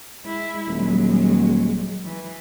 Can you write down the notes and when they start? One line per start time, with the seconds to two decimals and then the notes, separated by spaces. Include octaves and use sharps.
0.22 G#3 E4
0.67 D#1 F#3 G#3
2.05 E3